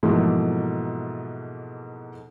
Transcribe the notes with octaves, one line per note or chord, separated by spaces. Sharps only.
G#2 B2 E3 F3 A3 A#3